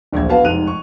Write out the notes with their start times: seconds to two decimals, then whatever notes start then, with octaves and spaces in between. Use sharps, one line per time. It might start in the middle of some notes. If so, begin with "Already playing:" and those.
0.12 D1 A#1 E4 C5 G#6
0.29 B3 F#4 B4 F5 A5
0.44 F1 G#2 C3 F#6 D#7 F7
0.67 C#6